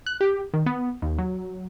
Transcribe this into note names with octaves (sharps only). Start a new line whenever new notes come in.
F#6
G4
D#3
B3
D#2
F#3